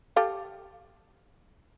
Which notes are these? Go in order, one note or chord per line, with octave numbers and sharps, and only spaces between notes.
G4 A4 F5